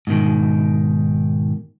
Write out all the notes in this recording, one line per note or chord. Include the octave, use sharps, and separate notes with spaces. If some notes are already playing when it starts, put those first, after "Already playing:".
G#2 B2 D#3